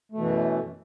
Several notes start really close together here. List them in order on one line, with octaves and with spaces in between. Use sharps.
A3 B2 E3 F#2